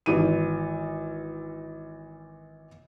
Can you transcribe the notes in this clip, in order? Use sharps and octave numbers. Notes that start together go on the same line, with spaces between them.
G#1 E3 D#7